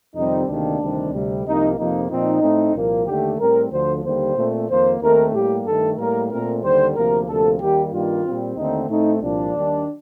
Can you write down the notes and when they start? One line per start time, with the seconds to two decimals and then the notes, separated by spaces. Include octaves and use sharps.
0.15 F2 C3 D#3 G3 C4 D#4
0.48 D2 C3 D#3 A#3 D4
0.80 D2 C3 D#3 G3 C4
1.12 D2 C3 G3
1.45 C2 C3 F3 A#3 D#4
1.78 F2 C3 F3 A#3 D#4
2.10 A#2 F3 C4 D#4
2.42 A2 A3 C4
2.74 C2 A#2 F3 A#3
3.06 D#2 D3 A3 G4
3.39 A2 G3 C4 A#4
3.71 D2 D3 F3 C5
4.04 D#2 D3 G3 A#3 C5
4.36 A#2 A3 C4
4.68 F2 D#3 A#3 C5
5.00 D#2 D#3 A3 C4 A#4
5.33 A2 G3 A#3 G4
5.65 G2 D#3 A3 A4
5.98 A2 G3 A#3 A#4
6.30 A#2 A3 C4 A#4
6.62 D#2 D3 G3 C5
6.95 D2 C3 F3 A#3 A#4
7.27 D2 C3 F3 A#3 A4
7.60 D#2 D#3 G3 A#3 G4
7.91 G2 D#3 G3 A#3 F4
8.25 A#2 G3 C4
8.57 D#2 D3 A3 C4 D#4
8.89 A2 A3 C4 D#4
9.21 C2 A#2 F3 D4
9.53 D#2 D#3 G3